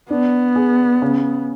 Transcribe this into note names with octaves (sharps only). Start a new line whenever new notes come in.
B3 D4
G#4
C#3